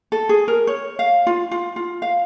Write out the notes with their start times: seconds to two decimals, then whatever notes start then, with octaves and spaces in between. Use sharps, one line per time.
0.12 A4
0.29 G#4
0.48 A#4
0.67 C#5
0.99 F5
1.27 F4
1.51 F4
1.76 F4
2.02 F5